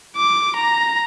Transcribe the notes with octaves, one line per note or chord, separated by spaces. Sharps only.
D6
A#5